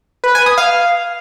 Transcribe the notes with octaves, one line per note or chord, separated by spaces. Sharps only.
B4
G#5
D#6
F5